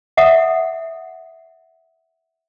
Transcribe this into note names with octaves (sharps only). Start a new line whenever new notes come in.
E5 F#5 D#6